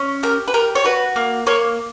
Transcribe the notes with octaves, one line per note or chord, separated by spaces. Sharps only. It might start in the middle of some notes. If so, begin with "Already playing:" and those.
Already playing: C#4
G4 A#4
B4
G4 A#4
C#5
F#4 B4
A#3
A#3 C#5